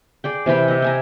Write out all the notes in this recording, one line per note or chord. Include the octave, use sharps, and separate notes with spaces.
G#4 D5 G5
C3 E3 G5 B5
D#5 E5
G5 G#5 A#5